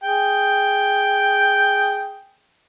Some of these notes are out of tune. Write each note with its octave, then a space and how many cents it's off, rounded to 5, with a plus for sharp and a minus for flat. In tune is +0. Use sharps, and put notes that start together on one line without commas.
G#4 +0 G5 +0